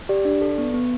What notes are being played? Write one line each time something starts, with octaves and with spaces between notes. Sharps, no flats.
G4 D5
D4 D5
A4
B3
B3